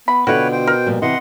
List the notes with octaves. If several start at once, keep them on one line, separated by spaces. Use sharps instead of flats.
B3 B5
B2 D3 F4 F#4 B4 C#5 F#5 G5
C5 G5
A#4
A#2 F3 G3
C3 E3 D#5 F#5 C6